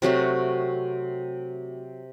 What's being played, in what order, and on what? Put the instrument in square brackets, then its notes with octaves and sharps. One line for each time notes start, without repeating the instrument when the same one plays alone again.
[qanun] C3 F#3 A3 F#4